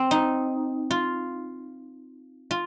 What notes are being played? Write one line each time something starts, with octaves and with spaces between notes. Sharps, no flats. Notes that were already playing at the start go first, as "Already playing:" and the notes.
Already playing: C4
D#4
F4
F4